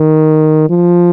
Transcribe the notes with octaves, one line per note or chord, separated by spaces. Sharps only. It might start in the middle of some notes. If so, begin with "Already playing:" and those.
Already playing: D#3
F3